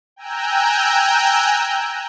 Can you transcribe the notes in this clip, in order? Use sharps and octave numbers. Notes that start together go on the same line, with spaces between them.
G5 G#5 A#5 E6 F#6 G6